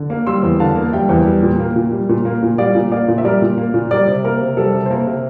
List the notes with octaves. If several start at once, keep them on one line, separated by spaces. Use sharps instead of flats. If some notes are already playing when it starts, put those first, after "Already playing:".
Already playing: D3
A#3
G3 C6 E6
E2
D3 F5 A5
A#3
G3 E5 G5
E2
G3
A#2
A#3
A#2
G3
A#2
A#3
A#2
G3 D5 F5
A#2
A#3 D5 F5
A#2
E5
G3 A#4 D5
A#2
A#3
A#2
G3 A#4 D5
C3
A#3 A#4
C3
G3 A4
C3
C5
A#3 A#4
C3